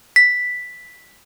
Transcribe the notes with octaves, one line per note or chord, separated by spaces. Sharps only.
B6